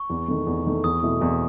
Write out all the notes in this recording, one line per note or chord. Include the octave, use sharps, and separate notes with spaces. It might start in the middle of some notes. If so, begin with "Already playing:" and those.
Already playing: C#6
E2
D#3 A3
E2
D#3 A3
E2 D#6
B2 A3 E4
E2